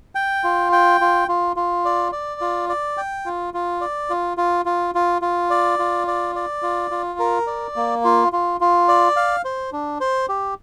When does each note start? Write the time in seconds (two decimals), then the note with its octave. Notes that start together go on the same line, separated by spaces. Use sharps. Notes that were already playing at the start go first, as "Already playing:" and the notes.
0.15 G5
0.44 F4
0.72 G5
1.01 F4
1.28 F4
1.56 F4
1.85 D5
2.12 D5
2.41 F4
2.69 D5
2.97 G5
3.26 F4
3.54 F4
3.81 D5
4.10 F4
4.37 F4
4.65 F4
4.95 F4
5.22 F4
5.50 D5
5.79 F4
6.07 D5
6.35 D5
6.62 F4
6.91 F4
7.19 A#4
7.47 D5
7.76 A#3
8.04 F4
8.33 F4
8.61 F4
8.88 D5
9.16 F5
9.45 C5
9.73 D4
10.01 C5
10.29 G4